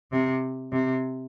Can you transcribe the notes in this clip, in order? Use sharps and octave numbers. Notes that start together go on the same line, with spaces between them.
C3
C3